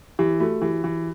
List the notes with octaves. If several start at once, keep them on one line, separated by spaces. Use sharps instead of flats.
E3 G4
A3 F#4
E3 G4
E3